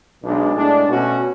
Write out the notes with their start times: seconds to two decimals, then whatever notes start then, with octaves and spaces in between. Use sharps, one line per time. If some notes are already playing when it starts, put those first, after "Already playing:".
0.22 B1 B2 G#3 D4
0.55 A2 G#3 D4
0.86 B2 A3 C#4 F#4